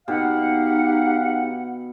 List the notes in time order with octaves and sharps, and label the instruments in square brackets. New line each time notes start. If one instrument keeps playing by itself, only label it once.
[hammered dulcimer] B2 [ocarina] D#4 [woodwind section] G4 F5 F#5